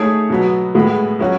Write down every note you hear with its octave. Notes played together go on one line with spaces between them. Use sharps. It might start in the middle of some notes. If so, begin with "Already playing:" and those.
Already playing: A3 D#4 G#4 C#5
B2 F#3 B3
A2 G#3 B3
F#3 C#4 F#4